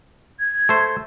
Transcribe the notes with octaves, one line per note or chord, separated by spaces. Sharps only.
G#6
A3 C5